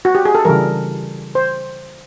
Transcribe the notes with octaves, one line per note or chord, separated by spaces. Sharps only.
F#4
G4
G#4
A4
C#3 E3 G3 A#4
C5